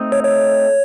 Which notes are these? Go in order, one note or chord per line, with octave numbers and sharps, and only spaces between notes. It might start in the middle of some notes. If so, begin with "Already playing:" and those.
Already playing: A3 C4 D#4
C#5
C#5